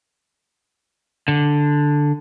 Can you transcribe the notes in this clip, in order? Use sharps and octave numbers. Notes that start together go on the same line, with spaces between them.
D3